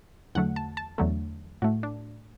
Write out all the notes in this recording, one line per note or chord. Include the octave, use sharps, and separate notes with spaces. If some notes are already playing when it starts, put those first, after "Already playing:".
E2 D3 F#3 A3 F#5
A5
A5
E2 D3 F#3 A3
A2 A3 F#4
D4